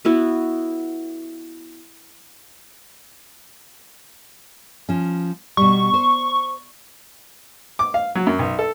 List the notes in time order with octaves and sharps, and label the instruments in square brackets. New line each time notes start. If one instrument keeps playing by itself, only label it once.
[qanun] B3 E4 F#4 B4
[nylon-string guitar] F3 C#4
[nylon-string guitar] B2 G3 [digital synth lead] C#6
[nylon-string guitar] C5
[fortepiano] D6
F5
F#3
F#2
B1
A4